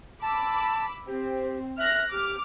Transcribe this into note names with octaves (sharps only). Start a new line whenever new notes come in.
A5 B5 D6 E6
C4 G4
E5 F6 F#6 A#6
G4 D6 F6